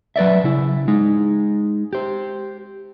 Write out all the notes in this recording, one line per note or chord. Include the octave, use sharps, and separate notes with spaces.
F#3 B4 D5 E5
C#3 E4
G#3 D#4
G4 C5